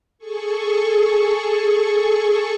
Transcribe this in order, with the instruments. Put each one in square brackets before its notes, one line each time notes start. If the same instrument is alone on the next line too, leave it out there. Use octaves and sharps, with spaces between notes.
[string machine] G#4 A4 C#6